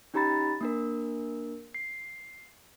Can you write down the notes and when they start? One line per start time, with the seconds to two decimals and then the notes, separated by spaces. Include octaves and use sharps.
0.14 C#4 D#4 G4 A#5 B5 A6
0.61 A#3 D4 A#4
1.74 C7